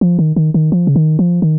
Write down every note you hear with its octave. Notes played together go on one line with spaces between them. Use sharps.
F3
D#3
D#3
D#3
F3
C#3
D#3
F3
D#3